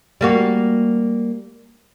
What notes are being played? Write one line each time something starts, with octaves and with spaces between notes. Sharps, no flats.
G3 A#3 F#4